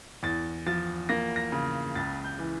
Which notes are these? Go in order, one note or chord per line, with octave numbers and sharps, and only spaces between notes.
E2 A6
F3 A6
A#3 A#6
A#6
C#3
C#2 A6
G6
E3